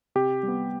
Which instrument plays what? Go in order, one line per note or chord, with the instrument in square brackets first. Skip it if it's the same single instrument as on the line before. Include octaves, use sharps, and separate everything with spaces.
[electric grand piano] C3 G4
G3
B3